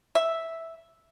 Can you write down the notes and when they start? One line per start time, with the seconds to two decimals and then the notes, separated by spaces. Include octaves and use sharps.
0.15 E5